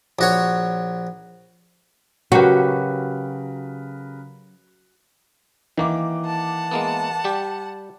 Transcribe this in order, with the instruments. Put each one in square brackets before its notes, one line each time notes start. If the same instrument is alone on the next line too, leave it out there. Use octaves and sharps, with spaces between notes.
[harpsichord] A#1 F#4 C#5
[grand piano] C#3 A#4 B4 [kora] F#3 G4 [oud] F#4
[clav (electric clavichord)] D#3 A#3 [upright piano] E3 D6
[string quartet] F#5 A5
[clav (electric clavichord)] G#3 A#3 B3
G3 G4